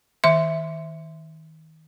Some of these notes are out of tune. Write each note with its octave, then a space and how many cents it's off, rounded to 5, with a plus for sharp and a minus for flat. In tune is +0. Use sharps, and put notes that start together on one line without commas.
D#3 +30 E5 +0 C6 -15